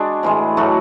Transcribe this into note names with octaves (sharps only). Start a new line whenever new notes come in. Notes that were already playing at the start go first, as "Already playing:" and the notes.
Already playing: G#3 D4 F#4
A2 E3 G#3
A2 F#3 A3 F#4